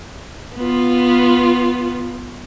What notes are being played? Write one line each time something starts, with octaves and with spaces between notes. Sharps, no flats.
B3 F4